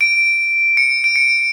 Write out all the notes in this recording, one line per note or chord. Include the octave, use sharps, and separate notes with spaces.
D7
C#7
D7
C#7